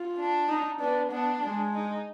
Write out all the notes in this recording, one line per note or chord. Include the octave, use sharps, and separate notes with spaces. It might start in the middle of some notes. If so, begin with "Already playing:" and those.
Already playing: F4
D4
D#4
B3 D4
B3 D4
G#3
D#4